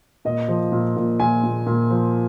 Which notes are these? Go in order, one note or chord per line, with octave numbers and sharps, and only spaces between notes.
A#2 D#5
F3
A#2
A#2
A#2 G#5
A#2
A#2
F3